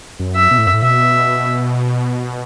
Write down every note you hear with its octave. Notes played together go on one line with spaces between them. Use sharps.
F#2
E5
B2
A2
F#2
A2
B2 E5